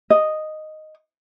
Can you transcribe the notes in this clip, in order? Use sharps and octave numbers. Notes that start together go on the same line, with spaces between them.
D#5